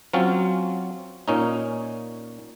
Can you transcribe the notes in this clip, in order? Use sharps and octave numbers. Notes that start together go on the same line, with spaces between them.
F#3 C4 C#4 F4
A#2 C#4 D#4